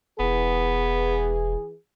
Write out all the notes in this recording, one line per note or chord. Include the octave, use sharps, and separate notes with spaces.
E1 E3 B3 G#4